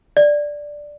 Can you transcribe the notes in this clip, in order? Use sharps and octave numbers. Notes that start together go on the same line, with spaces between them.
D5